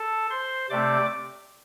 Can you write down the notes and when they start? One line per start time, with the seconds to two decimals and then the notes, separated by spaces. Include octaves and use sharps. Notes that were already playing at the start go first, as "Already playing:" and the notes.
Already playing: A4 A5
0.30 C5 C6
0.70 C3 A3 C4 D5 D6